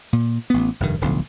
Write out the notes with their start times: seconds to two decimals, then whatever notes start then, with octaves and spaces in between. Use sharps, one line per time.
0.13 A#2
0.50 A1 B3
0.80 F1 G2 D#3
1.01 D1 B1 D3 F3